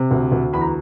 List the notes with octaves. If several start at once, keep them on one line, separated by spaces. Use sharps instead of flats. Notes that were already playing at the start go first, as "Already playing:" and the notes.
Already playing: C3
D2
D2
E2 B5
A#5